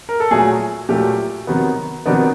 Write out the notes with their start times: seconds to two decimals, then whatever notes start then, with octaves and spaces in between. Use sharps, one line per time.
0.09 A#4
0.20 A4
0.31 A#2 F#3 A3 G#4
0.89 A#2 F#3 A3 G4
1.47 C3 D#3 F#3 B3
2.06 C3 D#3 F#3 B3 D4